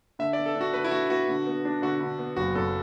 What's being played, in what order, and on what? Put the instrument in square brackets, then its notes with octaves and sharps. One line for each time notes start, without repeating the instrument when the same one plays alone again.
[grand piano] D3 [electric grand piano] E5
[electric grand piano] D5
[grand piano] B3
[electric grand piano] A4
[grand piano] D4
[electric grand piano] F#4
[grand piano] D3 [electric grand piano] B4
[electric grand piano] E4
[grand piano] D3 [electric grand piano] F#4
[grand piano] B3 [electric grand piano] F#4
[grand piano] D3
B3
D4
[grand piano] D3 [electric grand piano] F#4
[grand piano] D3
B3
[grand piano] F#1 [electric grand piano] F#4
[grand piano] F#2 [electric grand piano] A4